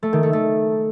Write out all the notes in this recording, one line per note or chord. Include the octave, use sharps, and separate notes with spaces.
A3
D#3
A3
A3